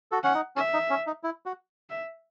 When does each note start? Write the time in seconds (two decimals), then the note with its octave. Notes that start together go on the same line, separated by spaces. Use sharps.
0.12 F#4 A4
0.23 C#4 F#5
0.34 D#4
0.56 C#4 E5
0.73 D#4
0.90 C#4
1.07 D#4
1.23 E4
1.46 F#4
1.90 E5